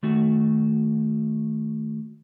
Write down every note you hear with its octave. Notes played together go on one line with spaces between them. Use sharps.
D#3 A3 F#4